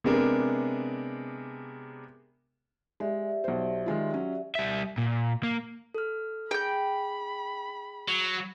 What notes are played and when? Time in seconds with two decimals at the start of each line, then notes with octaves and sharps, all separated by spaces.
0.04 C3 G#3 B3 D4 G#4 A#4
3.00 G#3 G4 D5 E5
3.44 B1 C5
3.86 D#3 G#3 F4
4.11 F#3 C#4
4.55 G3 E5
4.98 A#2
5.43 A#3
5.95 A4 F6
6.51 G#4 G5 B5 G6
8.08 F#3